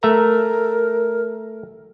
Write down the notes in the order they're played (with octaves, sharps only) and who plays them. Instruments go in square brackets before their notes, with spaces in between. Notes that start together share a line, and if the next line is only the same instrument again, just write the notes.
[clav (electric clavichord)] A3 E5 A#5 [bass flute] A#4